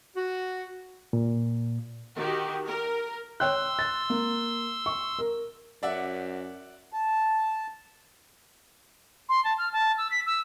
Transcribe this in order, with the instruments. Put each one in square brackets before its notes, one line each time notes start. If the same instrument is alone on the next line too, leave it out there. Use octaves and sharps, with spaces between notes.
[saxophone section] F#4
[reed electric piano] A#2
[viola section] D#3 F#4 G4
A#4
[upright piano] C#5 G5 F#6 [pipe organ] C6 E6
[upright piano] A6
A#3
C#6
A#4
[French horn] F#2 [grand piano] D5 E5 F#5
[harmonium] A5
[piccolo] C6
A5
F6
A5
E6
B6
E6